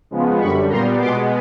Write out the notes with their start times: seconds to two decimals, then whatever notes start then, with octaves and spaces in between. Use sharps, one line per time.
0.11 C#3 F3 G#3 B3
0.39 F#2 D3 G3 B5 C#6
0.69 A#2 G3 B3 A#5 C6
0.99 B2 G#3 B3 C6 D6